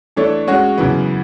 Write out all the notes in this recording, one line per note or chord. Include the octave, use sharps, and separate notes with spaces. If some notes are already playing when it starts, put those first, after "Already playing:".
E3 A3 D4 A4 C#5
G#3 C#4 F#4 C#5
F#2 C#3 E3 B3